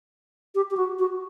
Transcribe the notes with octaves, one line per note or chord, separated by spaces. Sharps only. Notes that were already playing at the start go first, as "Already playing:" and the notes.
G4
G4
F#4
F#4